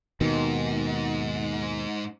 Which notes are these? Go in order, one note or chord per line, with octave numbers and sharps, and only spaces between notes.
D#2 G#2 B2 D#3